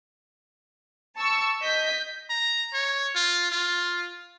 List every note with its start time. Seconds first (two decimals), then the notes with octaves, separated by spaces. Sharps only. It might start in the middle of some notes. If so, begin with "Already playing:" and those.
1.16 A5 C#6 E6
1.61 D#5 G6 B6
2.30 A#5
2.74 C#5
3.16 F4
3.52 F4